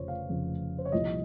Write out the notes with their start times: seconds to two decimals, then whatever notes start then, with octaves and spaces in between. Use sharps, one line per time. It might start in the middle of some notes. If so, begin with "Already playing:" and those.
Already playing: F1 F2 C#3 F3 C5 C#5
0.08 F5
0.29 F1 F2 C#3 F3
0.78 C5
0.85 C#5
0.92 C2 A#2 F3 D#5